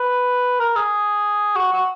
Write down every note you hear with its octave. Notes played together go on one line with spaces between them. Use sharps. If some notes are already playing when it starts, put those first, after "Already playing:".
Already playing: B4
A#4
G#4
F#4
F#4